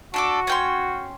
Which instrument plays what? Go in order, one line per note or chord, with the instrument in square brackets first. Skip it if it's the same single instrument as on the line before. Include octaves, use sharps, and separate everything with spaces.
[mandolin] D4 A4 D6 [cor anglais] F#4
[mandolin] C#4 G5 C6